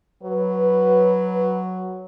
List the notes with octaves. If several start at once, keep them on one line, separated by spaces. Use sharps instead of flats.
F#3 B4